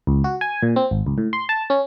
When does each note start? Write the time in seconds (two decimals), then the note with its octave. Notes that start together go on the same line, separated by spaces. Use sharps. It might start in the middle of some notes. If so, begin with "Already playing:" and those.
0.07 C#2
0.24 F#4
0.41 G#5
0.63 A#2
0.76 C4
0.91 G#1
1.06 C#2
1.18 A2
1.33 C6
1.49 A5
1.70 C#4